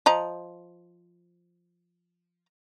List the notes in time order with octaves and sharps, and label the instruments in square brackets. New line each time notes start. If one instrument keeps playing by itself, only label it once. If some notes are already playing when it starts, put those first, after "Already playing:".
[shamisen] F3 D#5 A#5